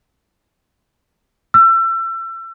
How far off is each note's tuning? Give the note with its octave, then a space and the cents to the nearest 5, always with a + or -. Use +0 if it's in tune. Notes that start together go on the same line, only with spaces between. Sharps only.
E6 +30